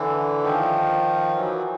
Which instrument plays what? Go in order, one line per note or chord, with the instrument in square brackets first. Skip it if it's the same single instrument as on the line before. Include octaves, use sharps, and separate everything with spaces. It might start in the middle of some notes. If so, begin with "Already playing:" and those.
Already playing: [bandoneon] D3 E3
D#3 F3
E3 F#3